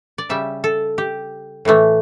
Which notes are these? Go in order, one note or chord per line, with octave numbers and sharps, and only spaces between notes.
D5
C#3 G3 E5
A4
G4
A2 E3 A3